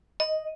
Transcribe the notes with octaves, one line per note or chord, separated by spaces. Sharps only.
D#5